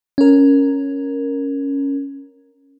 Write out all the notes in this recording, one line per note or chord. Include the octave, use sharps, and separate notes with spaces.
C#4 A#4